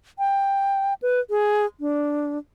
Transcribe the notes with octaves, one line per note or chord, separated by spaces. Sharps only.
G5
B4
G#4
D4